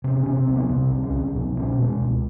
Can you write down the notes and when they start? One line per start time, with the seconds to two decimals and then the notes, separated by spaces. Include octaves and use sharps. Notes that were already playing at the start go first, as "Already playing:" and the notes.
0.04 C3 C#4
0.21 C#4
0.26 C3
0.37 C4
0.47 C2
0.53 B3
0.69 C3 C4
0.91 C2
1.02 C#4
1.13 C2
1.35 B2
1.57 B2 C#4
1.79 B2 G#3
2.00 C#2